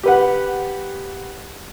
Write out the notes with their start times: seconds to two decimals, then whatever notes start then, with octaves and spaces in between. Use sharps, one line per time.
0.03 G4 B4 F#5